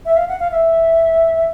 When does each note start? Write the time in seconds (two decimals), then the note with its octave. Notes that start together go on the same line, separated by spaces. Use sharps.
0.05 E5
0.17 F5
0.28 F#5
0.40 F5
0.51 E5